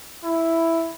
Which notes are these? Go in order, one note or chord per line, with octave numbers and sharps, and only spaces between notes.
E4